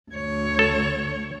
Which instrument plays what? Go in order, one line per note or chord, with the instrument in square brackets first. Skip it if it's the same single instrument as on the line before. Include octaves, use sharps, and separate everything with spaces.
[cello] D2 C#5
[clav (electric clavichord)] A4